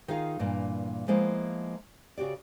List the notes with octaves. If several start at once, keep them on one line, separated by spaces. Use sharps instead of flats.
D#3 D#4 F4 G#4 F5
G2 A#2 E3 A#3
F3 G#3 A#3 B3 E4
C#3 F#4 G4 D5